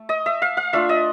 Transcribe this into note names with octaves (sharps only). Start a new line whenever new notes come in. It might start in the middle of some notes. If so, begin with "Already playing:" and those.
Already playing: A3
D#5
E5
F5
F5
A3 D4 F4 E5
D#5